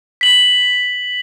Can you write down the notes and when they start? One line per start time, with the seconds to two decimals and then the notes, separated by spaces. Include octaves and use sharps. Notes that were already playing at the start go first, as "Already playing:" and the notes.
0.21 B6 F#7